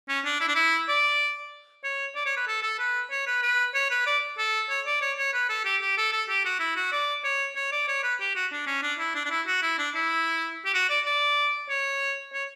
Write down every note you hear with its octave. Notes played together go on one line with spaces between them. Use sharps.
C#4
D4
E4
D4
E4
D5
C#5
D5
C#5
B4
A4
A4
B4
C#5
B4
B4
C#5
B4
D5
A4
C#5
D5
C#5
C#5
B4
A4
G4
G4
A4
A4
G4
F#4
E4
F#4
D5
C#5
C#5
D5
C#5
B4
G4
F#4
D4
C#4
D4
E4
D4
D4
E4
F#4
E4
D4
E4
G4
F#4
D5
D5
C#5
C#5